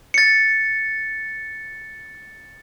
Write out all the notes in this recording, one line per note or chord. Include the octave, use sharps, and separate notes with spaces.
A6 C#7